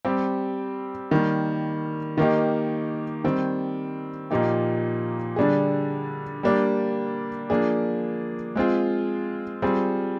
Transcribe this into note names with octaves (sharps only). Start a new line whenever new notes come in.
G3 C4 G4
D#3 G3 A#3
D#3 A#3 D#4 G4
D#3 G3 C4
A#2 F3 A#3 D#4 G4
D3 G3 D4 G#4
G3 A#3 D4 G4
F3 A#3 D4 G#4
G#3 C4 F4 G#4
G3 C4 F4 G#4